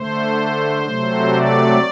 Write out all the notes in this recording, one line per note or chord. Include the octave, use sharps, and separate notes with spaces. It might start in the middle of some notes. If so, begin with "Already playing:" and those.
Already playing: D3 A3 C5
C3 F#3 A3
D5